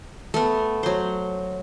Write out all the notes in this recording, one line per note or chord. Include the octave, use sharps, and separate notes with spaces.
A3 B3
F#3 C5